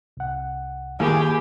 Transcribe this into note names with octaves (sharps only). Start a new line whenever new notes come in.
C2 F#5
D#2 D#3 G4 G#4 A#4 B5